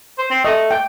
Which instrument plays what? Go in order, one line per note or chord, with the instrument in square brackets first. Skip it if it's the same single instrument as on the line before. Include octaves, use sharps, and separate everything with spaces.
[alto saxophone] C5
C4
[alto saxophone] A3 [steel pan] D#5
[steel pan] G5